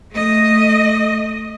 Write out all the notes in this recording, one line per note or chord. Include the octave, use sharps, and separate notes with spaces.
A3 D#5